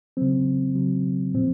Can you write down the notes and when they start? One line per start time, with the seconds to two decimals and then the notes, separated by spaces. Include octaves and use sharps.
0.17 C#3 F#3 C4
0.75 C#3 F#3
1.35 A#2 F3 C4